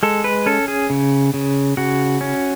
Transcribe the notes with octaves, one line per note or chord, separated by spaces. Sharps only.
G#3 A4
B4
C#4 A4
G#4
C#3
C#3
C#3 F#4
C#4